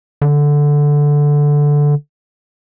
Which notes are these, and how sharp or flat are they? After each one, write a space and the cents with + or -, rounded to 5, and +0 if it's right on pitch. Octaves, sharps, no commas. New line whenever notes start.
D3 -5